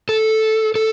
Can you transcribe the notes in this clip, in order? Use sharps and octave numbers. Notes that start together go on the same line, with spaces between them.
A4
A4